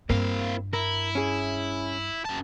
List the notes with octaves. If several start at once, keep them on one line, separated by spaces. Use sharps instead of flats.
G2 A#3 C4 E4 F5
E4 A#4
C#4 G#4
F#2 A5